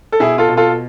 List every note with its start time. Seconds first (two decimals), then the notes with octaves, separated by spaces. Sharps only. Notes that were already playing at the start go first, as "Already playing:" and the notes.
0.12 A4
0.19 B2 E4 G#4
0.38 F4 A4
0.48 B2
0.57 F4 A4